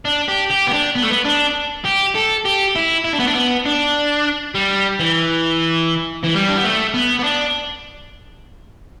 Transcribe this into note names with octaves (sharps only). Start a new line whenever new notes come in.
D4
G4
G4
B3
D4
B3
A3
B3
D4
G4
A4
G4
E4
E4
D4
B3
D4
B3
D4
G3
E3
E3
G3
D4
B3
A3
B3
B3
D4